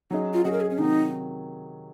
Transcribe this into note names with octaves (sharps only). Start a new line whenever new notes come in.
F#3 C#4 D#4 G#4 D#5
F4
F#3 C#4 F#4 G#4 D#5
A#4
G#4
C#4
C3 D#3 F#3 D#4